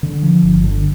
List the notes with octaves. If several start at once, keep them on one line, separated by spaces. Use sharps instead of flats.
D3
F3
G1
D3